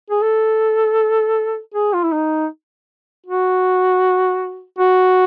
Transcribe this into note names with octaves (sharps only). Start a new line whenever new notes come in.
G#4
A4
G#4
F4
E4
D#4
F#4
F#4